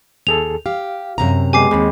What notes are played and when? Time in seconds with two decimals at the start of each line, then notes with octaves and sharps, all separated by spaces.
0.27 D#2 G#4 A4 F7
0.66 G4 F5
1.18 F#2 C3 A#5
1.53 G#3 B3 G4 G#5 D6 C7
1.71 D#2 G#3 C4 B5